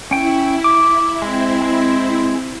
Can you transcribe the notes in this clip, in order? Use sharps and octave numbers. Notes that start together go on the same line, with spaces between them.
C#4 E4 G5
D6
G#3 C4 E4
G#3